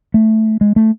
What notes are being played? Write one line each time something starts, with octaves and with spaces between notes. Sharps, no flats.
A3
G#3
A3